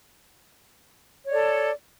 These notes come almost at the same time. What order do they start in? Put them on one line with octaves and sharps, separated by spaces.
C#5 D5 A4